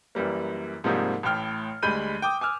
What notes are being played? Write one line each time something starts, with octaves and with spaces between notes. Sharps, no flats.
F#2 E3 G3 A#3
G#2 C3 F3 G3 A#3 D#4
A1 A2 G5 F6
D2 G3 G#3 B5 G6 D#7
G5 D6 D#6
G#5 D6 E6 F6